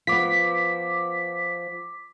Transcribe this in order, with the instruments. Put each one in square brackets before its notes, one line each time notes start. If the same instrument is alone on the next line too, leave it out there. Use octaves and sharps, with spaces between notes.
[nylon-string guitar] F3 B3 [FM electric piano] D6 B6